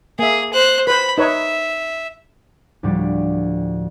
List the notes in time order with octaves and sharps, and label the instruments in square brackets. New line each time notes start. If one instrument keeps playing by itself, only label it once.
[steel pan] A#3 E5 [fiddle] G#4
[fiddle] C5 F#6
[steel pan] B4 C5 [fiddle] B5
[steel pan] D#4 B4 C#5 [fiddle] E5
[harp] D2 A2 F3 G3 D5